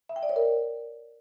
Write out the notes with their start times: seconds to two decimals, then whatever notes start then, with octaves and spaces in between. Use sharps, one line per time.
0.09 E5
0.16 G5
0.23 D5
0.29 C#5
0.36 A#4